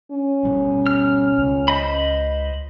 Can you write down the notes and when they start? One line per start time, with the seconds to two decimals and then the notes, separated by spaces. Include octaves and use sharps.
0.12 C#4
0.45 B2 G3
0.87 F6
1.38 C#2 C#3
1.68 C5 D#5 B5